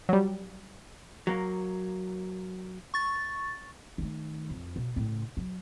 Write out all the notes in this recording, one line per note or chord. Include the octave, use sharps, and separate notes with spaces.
F#3 G3
F#3 A#3
C#6 A6
D#3 A3
F2
B2
A2 C#3
F#3